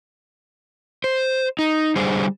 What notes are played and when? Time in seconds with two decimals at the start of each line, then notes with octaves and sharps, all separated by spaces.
1.04 C5
1.59 D#4
1.96 D3 G3 G#4 C5